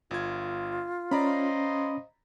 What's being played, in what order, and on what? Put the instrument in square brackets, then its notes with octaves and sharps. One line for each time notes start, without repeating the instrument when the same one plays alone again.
[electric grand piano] G1 G#6 [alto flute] F4
[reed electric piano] C#4 [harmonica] C5 D#5 F5 [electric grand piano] D5 A#5 B5